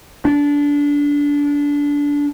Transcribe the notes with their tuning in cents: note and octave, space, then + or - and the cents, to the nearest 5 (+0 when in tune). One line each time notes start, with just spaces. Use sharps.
D4 -20